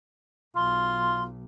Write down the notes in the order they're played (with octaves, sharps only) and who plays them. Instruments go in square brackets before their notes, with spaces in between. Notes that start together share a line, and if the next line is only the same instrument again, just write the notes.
[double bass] B1 [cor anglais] F4 [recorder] C6